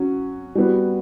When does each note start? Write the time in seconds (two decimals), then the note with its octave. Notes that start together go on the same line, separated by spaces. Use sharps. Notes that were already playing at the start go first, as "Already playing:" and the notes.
Already playing: F#3 C#4 F#4
0.55 G3 B3 F#4